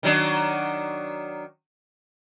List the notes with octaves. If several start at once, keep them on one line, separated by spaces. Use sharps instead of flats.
D#3 F#3 D4